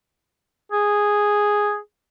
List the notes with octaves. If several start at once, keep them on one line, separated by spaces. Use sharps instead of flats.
G#4